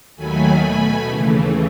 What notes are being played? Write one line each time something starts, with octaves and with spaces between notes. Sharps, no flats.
D#2 D#3 F#3 A3 G#5 B5
B2 A3 G#5 B5
D#2 C#3 E3 A3